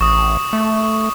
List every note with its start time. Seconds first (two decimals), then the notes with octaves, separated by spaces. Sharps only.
0.01 A1 C#6 D#6
0.53 A3